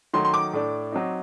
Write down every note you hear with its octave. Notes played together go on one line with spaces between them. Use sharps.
D#3 F#3 A3 C6
C6
D6
A2 A3 D4
F#3 C4 D#4